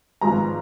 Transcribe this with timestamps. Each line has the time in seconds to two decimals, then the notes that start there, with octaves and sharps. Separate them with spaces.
0.21 G#1 G#2 F3 B3 A#5